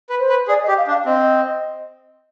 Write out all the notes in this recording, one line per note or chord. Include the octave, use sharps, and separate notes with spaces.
B4
C5
B4
G#4 D5
D#5
G4
F5
D4
F5
C4 D#5